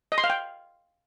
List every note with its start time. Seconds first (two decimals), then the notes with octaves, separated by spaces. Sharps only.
0.12 D#5
0.18 C6
0.24 F5
0.30 G5